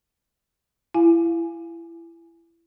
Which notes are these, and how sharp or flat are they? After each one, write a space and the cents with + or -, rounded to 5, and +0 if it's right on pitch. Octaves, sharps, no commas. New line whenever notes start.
E4 +25 F5 +5 G#5 +0